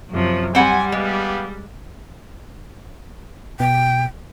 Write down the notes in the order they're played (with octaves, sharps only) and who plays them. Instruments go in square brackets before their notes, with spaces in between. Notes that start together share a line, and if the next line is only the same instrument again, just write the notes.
[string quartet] F#2 C3 F3
[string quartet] G3 [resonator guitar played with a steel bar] C4 F#5 [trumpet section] G#5
[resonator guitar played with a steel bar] G#3 [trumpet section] B3 G4 F5
[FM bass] B2 [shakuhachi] G5